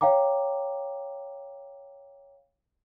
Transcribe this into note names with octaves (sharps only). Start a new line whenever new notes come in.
C#5 F5 G5 A#5 D6